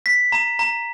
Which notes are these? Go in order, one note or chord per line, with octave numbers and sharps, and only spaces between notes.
B6
A#5
A#5